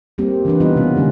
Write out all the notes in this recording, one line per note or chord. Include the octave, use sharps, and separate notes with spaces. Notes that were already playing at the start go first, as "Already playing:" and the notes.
G3 A#3 C4 G4
E3 C#4 D4 B4
G3 B3 D#4 F4 B4 D#5
C3 G3 B3 C#4
D3 G#3 C4 C#4